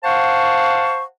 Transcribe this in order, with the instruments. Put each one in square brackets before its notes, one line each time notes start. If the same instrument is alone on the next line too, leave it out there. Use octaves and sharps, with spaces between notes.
[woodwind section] C5 F5 F#5 A5 C#6